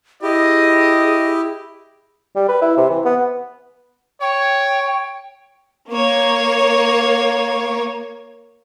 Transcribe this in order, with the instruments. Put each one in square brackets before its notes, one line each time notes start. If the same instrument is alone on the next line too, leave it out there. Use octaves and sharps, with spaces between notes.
[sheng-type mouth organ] E4 G4 [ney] G#4 [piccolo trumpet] D#5
[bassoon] G3
B4
E4
C3
E3
B3
[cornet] C#5 [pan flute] G5
[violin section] A#3 C#5